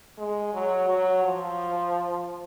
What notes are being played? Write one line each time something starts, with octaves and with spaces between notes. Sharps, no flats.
G#3
F#3
F#3
F3